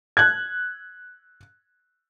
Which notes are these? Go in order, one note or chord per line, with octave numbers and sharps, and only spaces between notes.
F#6 G#6